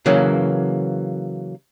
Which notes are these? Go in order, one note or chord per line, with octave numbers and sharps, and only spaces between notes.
C#3 E3 F#3 A#3